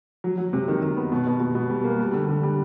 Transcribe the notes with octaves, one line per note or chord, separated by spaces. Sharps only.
F#3
F#3
C3
D#3
D#3
B3
B2
B2
B2
B2
G3
A#3
G3
D3
D3
G3